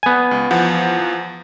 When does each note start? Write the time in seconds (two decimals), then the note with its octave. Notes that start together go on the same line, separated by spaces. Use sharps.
0.03 B3 G#5
0.31 C#2
0.51 E2 F3 F#5